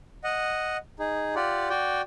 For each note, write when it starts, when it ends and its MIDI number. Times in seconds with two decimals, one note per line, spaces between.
0.24 0.77 75
0.24 0.77 78
0.99 1.35 63
0.99 1.35 68
1.35 1.69 65
1.35 1.69 67
1.35 1.69 74
1.35 1.69 78
1.70 2.02 66
1.70 2.02 74
1.70 2.02 79